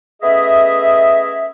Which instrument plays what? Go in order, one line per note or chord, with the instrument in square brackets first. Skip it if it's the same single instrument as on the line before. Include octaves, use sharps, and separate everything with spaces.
[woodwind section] A3 B3 C#4 G#4 D#5 E5